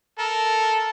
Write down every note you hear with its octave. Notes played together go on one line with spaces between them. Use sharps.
A4 A#4